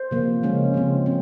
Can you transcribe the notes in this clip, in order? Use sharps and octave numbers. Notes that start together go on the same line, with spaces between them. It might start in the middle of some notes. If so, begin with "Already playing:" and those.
Already playing: C5
C3 F3 A#3
C#3 G#3 C#4
C#3 F3 C4
C4